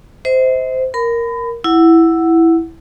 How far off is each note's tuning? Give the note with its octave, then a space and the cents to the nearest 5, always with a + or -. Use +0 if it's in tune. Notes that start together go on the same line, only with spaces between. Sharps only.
C5 -15 D#5 +45
A#4 +0 B5 +30
E4 +0 F#5 +0